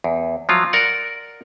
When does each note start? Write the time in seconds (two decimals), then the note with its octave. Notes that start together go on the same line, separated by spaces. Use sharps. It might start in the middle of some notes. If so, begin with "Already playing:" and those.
0.04 E2
0.49 F3 F#3 F4
0.73 A#4 D5 F#5